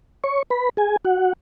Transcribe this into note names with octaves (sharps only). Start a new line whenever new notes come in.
C#5 C#6
B4 B5
G#4 G#5
F#4 F#5